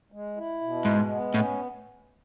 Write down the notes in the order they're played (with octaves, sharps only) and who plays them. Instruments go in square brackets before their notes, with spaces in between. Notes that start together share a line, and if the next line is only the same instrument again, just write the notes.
[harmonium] G#3
E4
B2
[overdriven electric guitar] G#2 [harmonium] G#3
[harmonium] B3
[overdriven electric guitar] A2 [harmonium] C#4